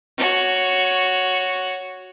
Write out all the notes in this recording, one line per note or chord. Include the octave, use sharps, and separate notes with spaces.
F#4 C#5